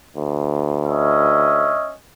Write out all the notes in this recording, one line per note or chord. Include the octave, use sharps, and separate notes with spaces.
D2
C#4 D#5 E5